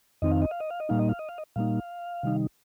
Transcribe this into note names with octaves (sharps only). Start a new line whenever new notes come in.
F2 D#3 C4 D#4 D#5
F5
D#5
F5
D#5
F5
D#5
A#2 G3 A#3 D#4 F5
D#5
F5
D#5
F5
D#5
A#2 G3 A#3 D#4 F5
C3 D#3 G3 D#4